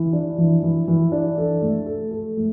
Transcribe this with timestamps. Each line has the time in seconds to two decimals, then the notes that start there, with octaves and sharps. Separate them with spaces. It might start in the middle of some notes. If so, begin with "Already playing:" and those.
Already playing: E3
0.13 D4
0.38 E3
0.63 E3
0.88 E3
1.12 D4
1.38 A4
1.62 A3
1.86 A4
2.11 A4
2.37 A3